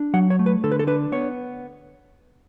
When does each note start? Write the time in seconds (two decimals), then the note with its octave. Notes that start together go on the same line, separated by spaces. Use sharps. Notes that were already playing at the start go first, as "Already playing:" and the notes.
Already playing: D4
0.14 F#3 F#5
0.30 C#5
0.39 A3
0.46 B4
0.64 D3 A4
0.72 B4
0.79 A4
0.87 D4 B4
1.12 B3 C#5